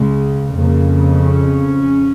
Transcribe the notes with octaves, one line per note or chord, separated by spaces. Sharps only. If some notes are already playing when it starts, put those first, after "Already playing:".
Already playing: C#2 C#3 G#3
F2 C#3 A#3
C#4